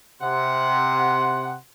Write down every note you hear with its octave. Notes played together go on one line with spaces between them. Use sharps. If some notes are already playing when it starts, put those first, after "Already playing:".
C3 F#5 C6